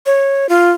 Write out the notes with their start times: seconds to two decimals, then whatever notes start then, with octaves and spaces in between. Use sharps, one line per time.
0.06 C#5
0.49 F4